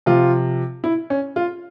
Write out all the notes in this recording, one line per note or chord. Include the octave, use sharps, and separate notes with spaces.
C3 F3 F4
E4
C#4
F4